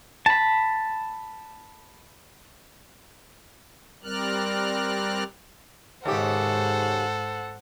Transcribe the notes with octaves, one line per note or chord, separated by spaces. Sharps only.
A5 B5
G3 C4 A#4 D5 F6 F#6
D#2 G#2 C#3 G4 A4 C5 F#5